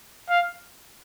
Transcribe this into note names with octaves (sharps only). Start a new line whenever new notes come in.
F5